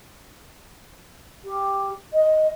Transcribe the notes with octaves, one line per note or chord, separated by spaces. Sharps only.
G4
D#5